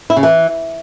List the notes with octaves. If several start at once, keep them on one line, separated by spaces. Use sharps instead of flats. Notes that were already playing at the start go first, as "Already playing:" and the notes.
E4
C#3
E3